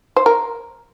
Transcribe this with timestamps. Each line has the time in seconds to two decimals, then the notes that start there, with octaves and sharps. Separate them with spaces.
0.16 C5
0.26 A#4